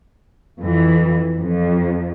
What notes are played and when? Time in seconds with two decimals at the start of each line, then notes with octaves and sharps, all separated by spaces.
0.61 F2 E3
1.38 F2